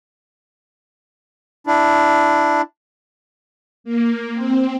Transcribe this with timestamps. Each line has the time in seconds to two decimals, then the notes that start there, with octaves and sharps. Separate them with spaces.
1.67 D4 E4
3.84 A#3
4.34 C4